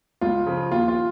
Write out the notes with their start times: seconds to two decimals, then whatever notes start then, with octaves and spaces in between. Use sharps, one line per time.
0.21 C#2 F4
0.46 C#3 F3
0.71 D#2 F4
0.88 F4